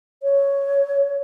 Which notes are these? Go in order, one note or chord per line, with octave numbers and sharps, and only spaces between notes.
C#5